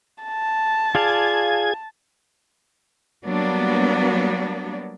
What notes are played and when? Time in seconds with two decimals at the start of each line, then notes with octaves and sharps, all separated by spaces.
0.23 A5
0.95 F4 G#4 D5 F5 G#6
3.26 F#3 G3 A#3 B3 D4